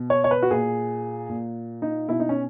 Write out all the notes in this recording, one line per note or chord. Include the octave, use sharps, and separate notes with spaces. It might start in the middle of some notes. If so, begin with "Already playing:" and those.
Already playing: B2
C#5
C#5
B4
F#4
A#2 G#4
A#2
D#4
B2 E4
D#4
C#4